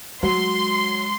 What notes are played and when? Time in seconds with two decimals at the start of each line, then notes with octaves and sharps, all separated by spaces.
0.23 F#3 G#3 C6